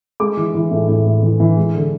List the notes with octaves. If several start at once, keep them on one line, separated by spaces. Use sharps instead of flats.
G#3 D6
E3
E3
A2
A2
A2
E3
E3
G#3
D3